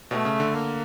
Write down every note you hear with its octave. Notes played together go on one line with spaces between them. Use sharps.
B2 A3
C#3
D3
A#3